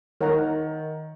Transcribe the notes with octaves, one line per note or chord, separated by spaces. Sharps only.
D#3 A#4 C#5 F#5 A#5